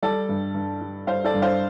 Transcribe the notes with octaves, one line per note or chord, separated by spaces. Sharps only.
G3 A4 D5
G2
G2
G3
G3 C5 F5
A4 D5
G2
C5 F5